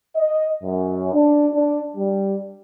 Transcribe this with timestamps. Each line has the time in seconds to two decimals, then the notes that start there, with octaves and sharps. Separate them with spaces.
0.16 D#5
0.63 F#2
1.14 D4
1.54 D4
1.96 G3